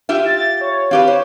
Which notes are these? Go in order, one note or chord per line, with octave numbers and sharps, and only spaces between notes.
F4 G4 E5
A6
C#5
C4 G4 B4 F5
C5 C#5